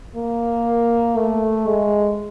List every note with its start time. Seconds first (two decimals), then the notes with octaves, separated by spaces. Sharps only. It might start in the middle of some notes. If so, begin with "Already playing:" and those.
0.16 A#3
1.17 A3
1.67 G#3